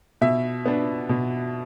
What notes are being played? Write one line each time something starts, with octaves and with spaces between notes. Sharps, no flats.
B2 E5
B3 D4
B2